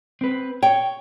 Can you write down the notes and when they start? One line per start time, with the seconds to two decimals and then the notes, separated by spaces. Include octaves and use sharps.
0.21 C4 B4
0.63 C#5 G5